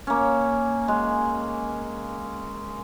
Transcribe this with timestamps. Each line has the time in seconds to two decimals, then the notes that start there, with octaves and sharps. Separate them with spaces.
0.07 A#3 C#4
0.88 G#3